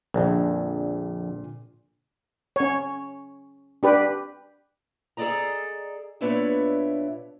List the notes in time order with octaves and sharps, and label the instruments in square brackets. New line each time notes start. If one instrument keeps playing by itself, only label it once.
[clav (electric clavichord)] A#1 F2 [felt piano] A#2 D3
[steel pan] C#4 C#5
D4 G4 B4
[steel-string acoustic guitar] G#4 A4 B4 D5 D#5 A#5
A#2 B3 D4 B4 C#5 E5